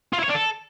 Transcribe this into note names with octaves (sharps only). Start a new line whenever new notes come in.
F4
E4
C#5
D4
A4